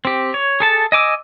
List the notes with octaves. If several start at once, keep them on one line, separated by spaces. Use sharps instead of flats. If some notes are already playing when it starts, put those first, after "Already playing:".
C4 G4
C#5
G#4 A4 A5
D#5 G#5 D6 E6